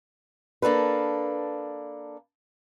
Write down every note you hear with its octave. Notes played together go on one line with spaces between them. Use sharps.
A#3 D4 A4 B4